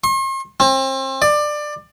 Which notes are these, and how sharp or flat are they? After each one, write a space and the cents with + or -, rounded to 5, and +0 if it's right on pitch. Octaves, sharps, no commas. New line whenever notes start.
C6 +45
C4 +35
D5 +20